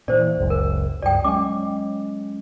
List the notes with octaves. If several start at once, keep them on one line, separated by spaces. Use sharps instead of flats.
A#2 E3 C5 D5
F#1 C#2 F#2
A#4
C#2 G2 D5 G5
F#3 G#3 C#4 D6